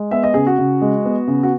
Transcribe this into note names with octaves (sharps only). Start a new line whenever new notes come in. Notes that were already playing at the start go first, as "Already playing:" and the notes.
Already playing: G#3
B3 E5
D#5
C#3 G#4
F#4
C#3
G#3
B3
C#3
F#4